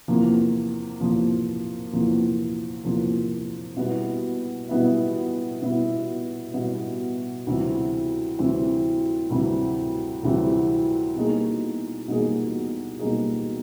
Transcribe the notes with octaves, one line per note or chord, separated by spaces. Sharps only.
E2 C3 F3 A#3
E2 C3 F3 A#3
E2 C3 F3 A#3
E2 C3 F3 A#3
B2 G3 B3 E4
B2 G3 B3 E4
B2 G3 B3 E4
B2 G3 B3 E4
D2 C3 E3 G3 C4
D2 C3 E3 G3 C4
D2 C3 E3 G3 C4
D2 C3 E3 G3 C4
B2 G3 A#3 D#4 G#4
B2 G3 A#3 D#4 G#4
B2 G3 A#3 D#4 G#4